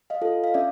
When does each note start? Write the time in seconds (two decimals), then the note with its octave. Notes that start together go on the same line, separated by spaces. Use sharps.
0.10 D#5 F5
0.21 F4 A4
0.44 F5
0.54 C#4 D5 E5